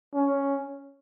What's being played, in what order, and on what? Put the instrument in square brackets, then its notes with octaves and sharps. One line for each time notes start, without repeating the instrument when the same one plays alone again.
[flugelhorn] C#4